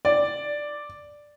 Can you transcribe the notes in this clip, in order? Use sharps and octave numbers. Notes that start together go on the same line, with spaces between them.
D5